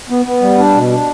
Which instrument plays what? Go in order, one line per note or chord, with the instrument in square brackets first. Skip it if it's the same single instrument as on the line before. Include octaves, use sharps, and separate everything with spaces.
[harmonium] B3
B3
G3
D4
B2
D4